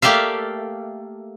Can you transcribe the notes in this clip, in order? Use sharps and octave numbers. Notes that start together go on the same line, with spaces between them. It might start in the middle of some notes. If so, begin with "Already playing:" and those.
A3 A#3 G4 D5 E5 F5